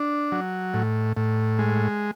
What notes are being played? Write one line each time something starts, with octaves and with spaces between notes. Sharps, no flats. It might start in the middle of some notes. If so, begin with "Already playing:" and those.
Already playing: D4
F#3
A2
A2
G#3